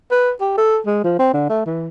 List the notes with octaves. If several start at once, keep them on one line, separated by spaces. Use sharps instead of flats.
B4
G4
A4
G#3
F3
C4
D3
A3
E3